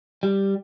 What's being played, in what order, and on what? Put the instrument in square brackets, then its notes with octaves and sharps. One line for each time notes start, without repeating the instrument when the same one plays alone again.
[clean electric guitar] G3